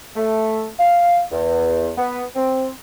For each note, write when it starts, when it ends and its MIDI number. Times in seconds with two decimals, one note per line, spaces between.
0.16 0.66 57
0.79 1.21 77
1.32 1.91 40
1.98 2.23 59
2.36 2.69 60